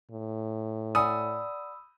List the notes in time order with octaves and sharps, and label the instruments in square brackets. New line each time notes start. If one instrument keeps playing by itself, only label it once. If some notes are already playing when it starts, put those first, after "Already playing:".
[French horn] A2
[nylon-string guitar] D5 F#5 G#5 [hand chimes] B5 E6 [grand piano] D#6